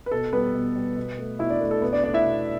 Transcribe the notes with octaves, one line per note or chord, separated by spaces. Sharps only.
B4
B2 A4
G3 B3 B4
B2
G3
B2
A3
B2 E4 E5
D4 D5
A3
A4
B2 B3 B4
D4 D5
A3 D4 D5
E4 E5
B2